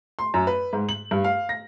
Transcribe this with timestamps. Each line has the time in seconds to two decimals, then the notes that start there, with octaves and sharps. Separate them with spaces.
0.19 C6
0.34 F#2
0.47 B4
0.73 G#2
0.89 F#7
1.11 G2
1.24 F5
1.49 A#6